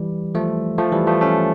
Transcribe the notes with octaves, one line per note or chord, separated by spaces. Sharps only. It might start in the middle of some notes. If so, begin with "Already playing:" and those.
Already playing: E3 G3
F3 A3
F3 A3
E3 G3
F3 A3
A3 C#4